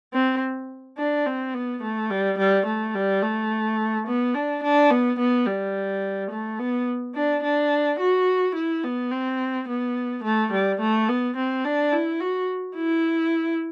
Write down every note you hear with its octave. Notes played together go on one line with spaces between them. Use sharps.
C4
D4
C4
B3
A3
G3
G3
A3
G3
A3
B3
D4
D4
B3
B3
G3
A3
B3
D4
D4
F#4
E4
B3
C4
B3
A3
G3
A3
B3
C4
D4
E4
F#4
E4